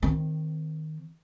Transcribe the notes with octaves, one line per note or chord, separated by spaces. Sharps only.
D#3 C4